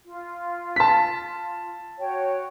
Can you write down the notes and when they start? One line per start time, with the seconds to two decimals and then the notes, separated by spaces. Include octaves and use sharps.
0.05 F4
0.76 A5 B6
1.99 F#4 C#5 G5